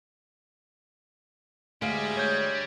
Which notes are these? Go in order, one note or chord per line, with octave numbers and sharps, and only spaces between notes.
D2 G3 G#3 F5
C#5 G6